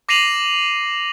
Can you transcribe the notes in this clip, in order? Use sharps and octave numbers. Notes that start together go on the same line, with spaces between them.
D6 A#6 C7 D#7 F7 F#7